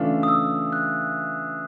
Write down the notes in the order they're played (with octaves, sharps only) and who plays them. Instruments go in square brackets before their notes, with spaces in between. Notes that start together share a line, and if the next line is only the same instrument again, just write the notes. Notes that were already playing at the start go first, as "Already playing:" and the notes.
Already playing: [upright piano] C#3 E3 A3 D4 F4
[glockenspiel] D#6
E6
F#6